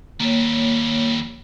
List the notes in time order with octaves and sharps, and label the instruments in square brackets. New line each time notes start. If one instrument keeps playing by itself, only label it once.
[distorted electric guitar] D#2 G3 [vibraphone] A#3 C#5